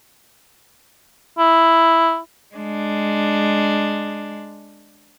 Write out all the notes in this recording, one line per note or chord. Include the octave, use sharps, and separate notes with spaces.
E4
G#3 D4